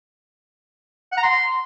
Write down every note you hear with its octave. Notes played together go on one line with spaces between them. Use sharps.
F#5
A#5
C6